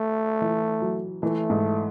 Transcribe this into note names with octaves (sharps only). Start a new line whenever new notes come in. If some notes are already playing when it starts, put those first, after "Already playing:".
Already playing: A3
E3
F#3
E3 A3
G#2